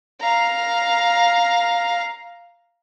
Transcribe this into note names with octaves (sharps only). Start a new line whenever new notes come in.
F5 A#5